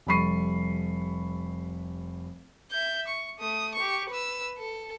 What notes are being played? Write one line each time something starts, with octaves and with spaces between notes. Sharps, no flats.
F1 G3 B5 C#6 C7 D#7
E5 G6
C#6
A3 D#6
G4 C#6
B4 E6
A4